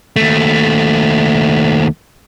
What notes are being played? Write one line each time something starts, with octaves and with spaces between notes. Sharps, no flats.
D#2 A3